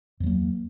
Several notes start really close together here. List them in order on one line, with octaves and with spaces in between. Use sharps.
E2 F#3 A#3